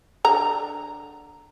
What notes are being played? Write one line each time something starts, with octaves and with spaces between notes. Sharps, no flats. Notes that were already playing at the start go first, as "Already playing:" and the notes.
D3 A#5